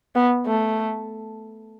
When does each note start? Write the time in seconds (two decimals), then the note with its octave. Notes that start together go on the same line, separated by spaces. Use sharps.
0.15 B3
0.46 A3